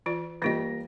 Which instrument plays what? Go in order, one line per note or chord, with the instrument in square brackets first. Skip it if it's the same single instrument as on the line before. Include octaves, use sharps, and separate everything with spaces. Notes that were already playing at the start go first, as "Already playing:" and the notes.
[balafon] E3 F4 D5
[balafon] E3 F4 D#5 [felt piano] G3 A#3 A#6